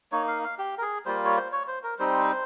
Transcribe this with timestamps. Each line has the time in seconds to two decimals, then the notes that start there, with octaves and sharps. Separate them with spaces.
0.12 A#3 D#4 C#5
0.27 F5
0.44 F5
0.59 G4
0.78 A#4
0.82 G#4
1.06 G3 A#3 F4 C5
1.25 C#5
1.37 C5
1.52 C#5
1.68 C5
1.83 A#4
1.99 G3 C4 D#4 C5